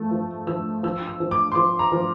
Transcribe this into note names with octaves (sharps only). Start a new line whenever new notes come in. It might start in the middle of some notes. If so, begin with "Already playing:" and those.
Already playing: F3 A3
F3
F3 E6
F3 E6
E6
F3
D6
C6
F3 D6
A#5
F3